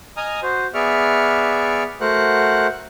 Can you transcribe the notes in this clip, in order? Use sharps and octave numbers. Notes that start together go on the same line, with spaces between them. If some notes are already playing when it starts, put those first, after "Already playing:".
D#5 G#5 A#5 D#6 F6
F#4 C5
B3 G#4 D5 E5 C#6 F6
A3 F#4 A#4 C5 F#5 F#6